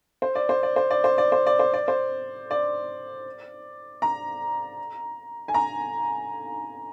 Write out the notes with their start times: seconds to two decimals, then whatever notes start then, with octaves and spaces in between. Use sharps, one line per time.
0.22 C5
0.35 D5
0.49 C5
0.63 D5
0.76 C5
0.90 D5
1.04 C5
1.18 D5
1.32 C5
1.46 D5
1.59 C5
1.73 D5
1.88 C5
2.51 D5
4.02 A#5
5.48 G#5
5.54 A#5